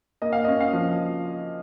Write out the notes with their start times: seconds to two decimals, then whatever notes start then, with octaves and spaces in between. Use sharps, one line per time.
0.22 A#3 D#5
0.33 F5
0.44 D#5
0.48 C#4
0.60 F5
0.73 F3